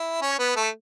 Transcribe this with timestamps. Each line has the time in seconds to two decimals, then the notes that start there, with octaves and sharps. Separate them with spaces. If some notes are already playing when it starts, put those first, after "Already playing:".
Already playing: E4
0.22 C#4 C#5
0.39 B3 B4
0.56 A3 A4